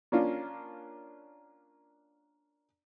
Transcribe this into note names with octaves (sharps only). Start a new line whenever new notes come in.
A#3 C#4 D4 F4